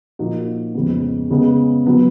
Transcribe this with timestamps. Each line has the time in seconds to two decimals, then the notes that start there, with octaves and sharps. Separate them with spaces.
0.19 A#2 F3 A#3 D#4 F#4
0.75 F2 C#3 G#3 B3
1.30 C#3 G#3 B3
1.86 F#3 B3